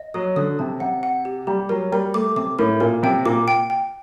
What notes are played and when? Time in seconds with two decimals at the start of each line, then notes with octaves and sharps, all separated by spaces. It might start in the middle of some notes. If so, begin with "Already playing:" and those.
Already playing: D#5
0.14 F#3 D#6
0.36 D3 D#6
0.59 C3 A5
0.80 C3 F#5
1.03 F#5
1.25 G4
1.47 G3 G4
1.69 F#3 A#4
1.92 G3 A#4
2.14 A3 D6
2.36 C3 D6
2.59 A2 A#4
2.80 A#2 A#4
3.03 C3 G5
3.25 A#2 D6
3.48 G5
3.70 G5